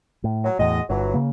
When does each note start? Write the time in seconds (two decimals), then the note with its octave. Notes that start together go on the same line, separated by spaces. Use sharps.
0.24 A2
0.44 F#3
0.59 E2 A2 G#3 F#4 D#5
0.90 G1 E3 F#3
1.14 C#3 A#3